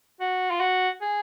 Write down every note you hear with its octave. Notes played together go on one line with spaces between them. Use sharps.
F#4
F4
F#4
G#4